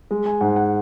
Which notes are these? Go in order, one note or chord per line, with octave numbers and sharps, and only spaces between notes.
G#3
G#5
G#2 F#5
F#5